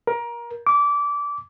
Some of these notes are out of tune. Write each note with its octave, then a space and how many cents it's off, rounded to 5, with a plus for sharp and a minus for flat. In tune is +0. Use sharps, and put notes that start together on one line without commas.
A#4 +25
D6 -20